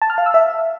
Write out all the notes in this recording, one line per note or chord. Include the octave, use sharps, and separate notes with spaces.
A5
F6
F5
E6
E5